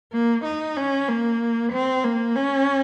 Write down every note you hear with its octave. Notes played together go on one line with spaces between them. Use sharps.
A#3
D#4
C#4
A#3
C4
A#3
C#4